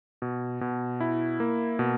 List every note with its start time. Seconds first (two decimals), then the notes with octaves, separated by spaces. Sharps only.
0.22 B2
0.61 B2
1.00 E4
1.40 A#3
1.79 B2